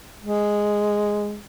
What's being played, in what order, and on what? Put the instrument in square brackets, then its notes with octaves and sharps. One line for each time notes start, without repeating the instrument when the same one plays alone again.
[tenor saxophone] G#3